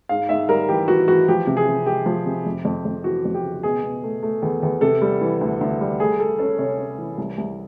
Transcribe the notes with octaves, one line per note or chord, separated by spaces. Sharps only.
G#2 F5
G#2 E5
G3 A#4
E3 G4
E3 F#4
E3 F#4
F3 G4
C3
G#4
C3
G#3 G4
F3
C3
F2
F2
F2
E3 F#4
F2
G4
C#3
B2 G#4
B2
A3
A3
E2
E2
C3 A4
G3
E3
D2
D2
G3
A3 G#4
A3 A4
C#4 A4
C3 C#5
C#4
E3
C2
C2